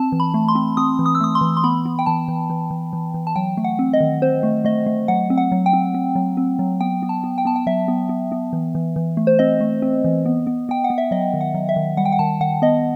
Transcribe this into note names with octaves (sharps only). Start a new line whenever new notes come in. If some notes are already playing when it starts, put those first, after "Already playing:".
Already playing: C4 A5
E3
B5
A3
C6
C4
C4 D#6
E3
D#6
E6
A3 D#6
C6
E3
C6
B3 B5
B3
G5
E3 A5
E3
E3
E3
E3
E3
A5
F#3 G5
A3
F#5
C4
D#5
D#3
C4 C5
A3
A3 D#5
A3
F#3 F#5
C4
F#5
F#3
G5
C4
C4
F#3
C4
F#3
B3 G5
B3
A5
B3
G5
B3 A5
G5
F#3 E5
B3
B3
B3
E3
E3
E3
A3
C5
C4 D#5
A3
C4
E3
B3
B3
B3 G5
F#5
B3
E5
F#3 D#5
D#3
F#5
F#3
E5
D#3
G3 F#5
G5
F#5
D#3 A5
D#3 F#5
B3 D#5